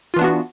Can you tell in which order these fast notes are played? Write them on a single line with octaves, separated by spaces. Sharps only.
F4 E3 D4 B3 F#4